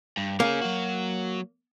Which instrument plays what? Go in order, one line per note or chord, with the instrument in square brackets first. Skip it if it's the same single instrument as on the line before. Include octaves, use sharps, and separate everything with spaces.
[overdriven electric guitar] G2
[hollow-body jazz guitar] A#3 [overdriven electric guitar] C#4 G#4
[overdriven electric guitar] F#3 F#4